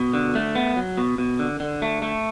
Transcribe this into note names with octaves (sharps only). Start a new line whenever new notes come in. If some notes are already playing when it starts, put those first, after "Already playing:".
Already playing: B2
D3
A3
B3
F#3
B2
B2
D3
D3
A3
A3